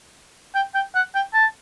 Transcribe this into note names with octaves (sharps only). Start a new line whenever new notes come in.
G5
G5
F#5
G5
A5